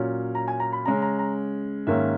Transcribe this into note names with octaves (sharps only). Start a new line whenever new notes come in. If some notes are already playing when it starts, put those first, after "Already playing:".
Already playing: A#2 F#3 C#4
A#5
G#5
A#5
B5
C#3 G#3 C#4 A#5
A#5
A#5
G#2 D#3 A#3 C#4 E5